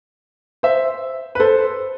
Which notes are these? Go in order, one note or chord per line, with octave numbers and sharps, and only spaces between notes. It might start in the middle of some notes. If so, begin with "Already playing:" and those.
C5 E5
B4
A4 C5